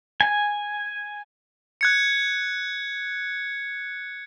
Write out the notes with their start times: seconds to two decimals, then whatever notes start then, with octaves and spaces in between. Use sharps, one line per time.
0.21 G#5
1.81 F#6 G#6 C#7